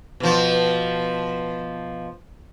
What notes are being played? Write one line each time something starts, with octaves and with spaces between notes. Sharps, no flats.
B2 F3